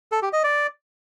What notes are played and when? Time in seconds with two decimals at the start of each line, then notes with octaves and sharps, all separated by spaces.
0.12 A4
0.22 G4
0.33 D#5
0.44 D5